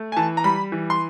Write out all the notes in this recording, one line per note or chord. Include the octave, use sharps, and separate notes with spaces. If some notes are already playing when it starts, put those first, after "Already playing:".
Already playing: A3
G#5
E3 A5
A#5
G3 B5
E3
C6